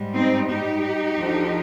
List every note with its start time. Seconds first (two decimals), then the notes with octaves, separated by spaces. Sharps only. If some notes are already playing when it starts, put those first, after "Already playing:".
Already playing: G#2 G3
0.15 C4 D#4
0.49 D#4 G4
1.15 D2 D3 F3